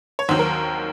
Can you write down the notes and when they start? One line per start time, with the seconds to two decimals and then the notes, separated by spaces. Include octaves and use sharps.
0.19 C#5
0.28 D#2 D#3 F#3 C5
0.39 A#4